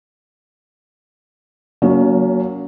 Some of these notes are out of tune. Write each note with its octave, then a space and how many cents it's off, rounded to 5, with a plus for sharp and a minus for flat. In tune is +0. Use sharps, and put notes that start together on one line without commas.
F#3 +0 A#3 +0 C#4 +40